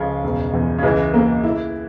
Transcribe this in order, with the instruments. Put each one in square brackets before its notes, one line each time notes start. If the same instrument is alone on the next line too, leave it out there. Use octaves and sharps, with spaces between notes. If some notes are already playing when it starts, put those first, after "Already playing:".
Already playing: [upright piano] C#2 [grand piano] C#3 F3
[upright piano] E1
E2
[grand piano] C#3
[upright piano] C#2 [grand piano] E3
[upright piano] A#3
E4